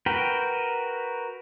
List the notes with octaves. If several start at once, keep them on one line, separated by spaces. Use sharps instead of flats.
F#4 A#4 B4 G5